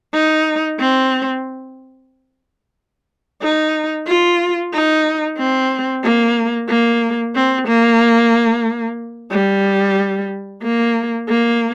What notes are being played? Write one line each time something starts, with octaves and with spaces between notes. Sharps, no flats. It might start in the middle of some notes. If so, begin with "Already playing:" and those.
D#4
C4
D#4
F4
D#4
C4
A#3
A#3
C4
A#3
G3
A#3
A#3